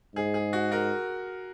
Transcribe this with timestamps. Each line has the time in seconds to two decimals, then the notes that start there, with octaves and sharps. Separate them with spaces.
0.15 G#2 G#4
0.34 G#4
0.53 F#4
0.71 F#4 A#4